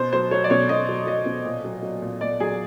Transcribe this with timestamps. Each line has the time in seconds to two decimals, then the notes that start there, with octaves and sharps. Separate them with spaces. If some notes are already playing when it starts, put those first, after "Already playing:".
Already playing: B2 C5
0.13 F#3 C5
0.31 F#3 C#5
0.44 D5
0.50 B2 C#5
0.69 B2 D#5
0.89 F#3
1.07 F#3 D#5
1.26 B2
1.45 A#2
1.65 F#3
1.83 F#3
2.02 A#2
2.21 A#2 D5
2.40 F#3 G#4